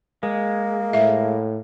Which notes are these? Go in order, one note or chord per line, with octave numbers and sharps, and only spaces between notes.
G#3 A#3
A2 E5